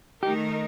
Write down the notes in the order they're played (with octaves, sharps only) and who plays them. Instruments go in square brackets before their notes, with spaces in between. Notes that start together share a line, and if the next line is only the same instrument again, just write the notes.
[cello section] D#3 A3 D#4 A#4 [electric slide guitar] G4